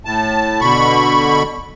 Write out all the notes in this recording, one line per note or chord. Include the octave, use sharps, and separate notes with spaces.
A2 A5
B2 D3 B5 C#6